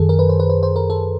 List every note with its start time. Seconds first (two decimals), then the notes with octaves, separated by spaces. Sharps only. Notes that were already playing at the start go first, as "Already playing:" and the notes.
Already playing: F#2 D#3 G#4 A4
0.09 A#4
0.19 B4
0.29 C5
0.40 B4
0.50 C5
0.63 C5
0.76 A#4
0.90 A4